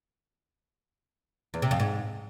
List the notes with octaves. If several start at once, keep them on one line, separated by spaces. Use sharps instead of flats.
E2
C3
F2
G#2